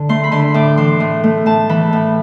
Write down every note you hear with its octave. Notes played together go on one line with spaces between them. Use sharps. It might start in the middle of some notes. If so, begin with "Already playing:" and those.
Already playing: D3
A3 C6
B5
D3 C6
A2 D6
E3 C6
A2
A3
A2 A5
E3 B5
A2